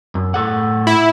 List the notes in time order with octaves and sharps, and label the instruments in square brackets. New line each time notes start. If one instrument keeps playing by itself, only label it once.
[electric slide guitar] F#2
A2 A4 F#5
[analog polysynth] E4